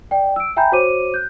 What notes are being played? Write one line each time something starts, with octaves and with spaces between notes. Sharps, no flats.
D5 G5
E6 D7
E5 G5 G#5 A#5 B5 G6
F#4 C5 C#5 D6 D#7
F#6 G6